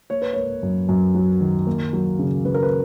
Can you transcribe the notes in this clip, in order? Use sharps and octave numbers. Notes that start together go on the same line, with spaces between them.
A#3 C#5
B4
A#3 C#5
F#2
F#2
F#3
D#3
A#3
F#3
C#3
C#3 B4
A#4
B4